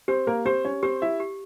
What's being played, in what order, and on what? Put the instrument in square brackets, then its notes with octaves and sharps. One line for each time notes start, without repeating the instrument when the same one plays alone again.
[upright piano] C4 C5 [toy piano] G4
[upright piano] A#3 A#4
[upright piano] C4 C5 [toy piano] G4
[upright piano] C#4 C#5
[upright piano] C4 C5 [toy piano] G4
[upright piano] E4 E5
[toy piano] G4